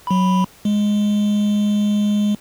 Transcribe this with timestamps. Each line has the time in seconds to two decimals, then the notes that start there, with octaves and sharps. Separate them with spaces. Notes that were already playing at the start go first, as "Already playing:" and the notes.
0.07 F#3 B5
0.65 G#3